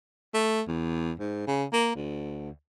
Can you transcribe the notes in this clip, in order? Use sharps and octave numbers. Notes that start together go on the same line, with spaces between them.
A3
E2
G#2
C#3
A#3
D2